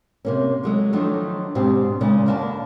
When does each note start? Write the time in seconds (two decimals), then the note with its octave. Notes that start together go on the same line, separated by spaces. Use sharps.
0.25 C3 A#3 C#4
0.64 F#3 G#3 A3
0.93 D#3 F3 F#3 A3 D4 D#4
1.55 G#2 B2 C4 D4 G4 C5
2.01 A#2 C#3 G#3 D5
2.26 D#2 D3 A#3 D5 A5